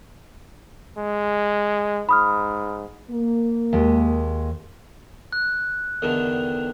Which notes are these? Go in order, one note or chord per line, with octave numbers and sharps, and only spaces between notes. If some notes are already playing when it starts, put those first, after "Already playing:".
G#3
G#2 B5 D#6 F6
A#3
D#2 G#3
F#6
E2 D3 D#3